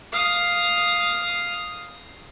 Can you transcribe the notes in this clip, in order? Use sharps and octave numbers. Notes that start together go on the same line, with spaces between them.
F5 D#6